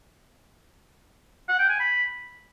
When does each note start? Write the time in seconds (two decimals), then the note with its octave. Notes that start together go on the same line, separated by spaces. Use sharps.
1.49 F#5
1.59 G5
1.69 G#5
1.80 B5